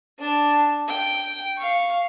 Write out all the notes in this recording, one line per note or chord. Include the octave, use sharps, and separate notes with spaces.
D4 A5
G5
F5 C#6